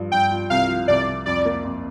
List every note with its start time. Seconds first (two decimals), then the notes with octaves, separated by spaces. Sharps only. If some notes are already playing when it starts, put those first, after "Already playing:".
Already playing: G2 F3
0.12 G2 G5
0.31 F4
0.50 C2 F5
0.68 F3
0.88 C2 D5
1.07 C2
1.26 F2 D5
1.45 A#3
1.64 F2